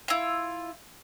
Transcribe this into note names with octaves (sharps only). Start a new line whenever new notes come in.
E4 F4